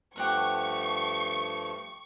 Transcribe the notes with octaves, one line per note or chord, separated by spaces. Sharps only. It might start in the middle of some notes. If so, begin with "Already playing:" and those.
G2 F3 A3 G4 F#5 C6 C#6